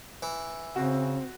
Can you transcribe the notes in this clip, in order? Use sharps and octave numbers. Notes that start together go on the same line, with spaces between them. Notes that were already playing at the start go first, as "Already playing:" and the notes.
E3
C#3 C4 F#4